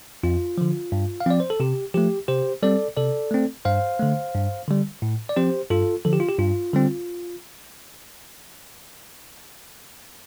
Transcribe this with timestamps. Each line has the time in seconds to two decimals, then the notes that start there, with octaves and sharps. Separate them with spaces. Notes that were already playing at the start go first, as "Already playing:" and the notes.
0.23 F2 F4
0.58 D3 F3
0.92 G2
1.20 F5
1.26 F3 C4 D5
1.40 C5
1.50 A4
1.60 C3 G4
1.94 F3 A3 G4
2.28 C3 G4 C5
2.63 G3 C4 A4 D5
2.97 C3 A4 D5
3.31 A3 C4
3.65 G2 C5 F5
4.00 D3 A3
4.34 G2
4.68 D3 G3
5.02 A2
5.29 D5
5.36 F3 C4 G4 C5
5.70 G2 F4 A4
6.05 D3 F3 A4
6.13 G4
6.20 F4
6.29 G4
6.39 G2 F4
6.73 D3 G3 C4